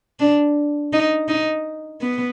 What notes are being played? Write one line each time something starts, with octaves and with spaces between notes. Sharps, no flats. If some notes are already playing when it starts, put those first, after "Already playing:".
D4
D#4
D#4
B3